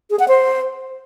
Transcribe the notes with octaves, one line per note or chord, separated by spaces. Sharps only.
G#4
F#5
C5